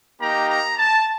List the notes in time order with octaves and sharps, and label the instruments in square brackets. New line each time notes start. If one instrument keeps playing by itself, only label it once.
[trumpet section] A#3 D#4 G4 A#5
A#5
A5